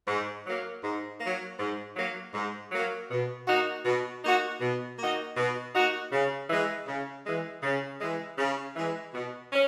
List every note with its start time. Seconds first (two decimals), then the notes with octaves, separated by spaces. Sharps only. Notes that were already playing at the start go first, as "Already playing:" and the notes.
0.08 G#2
0.46 F#3 A#3
0.84 G#2
1.21 F#3 A#3
1.59 G#2
1.97 F#3 A#3
2.34 G#2
2.72 F#3 A#3
3.11 B2
3.48 A#3 D#4 F#4
3.85 B2
4.24 A#3 D#4 F#4
4.61 B2
4.98 A#3 D#4 F#4
5.37 B2
5.74 A#3 D#4 F#4
6.12 C#3
6.50 E3 G#3
6.87 C#3
7.26 E3 G#3
7.63 C#3
8.01 E3 G#3
8.38 C#3
8.76 E3 G#3
9.14 B2
9.53 C#4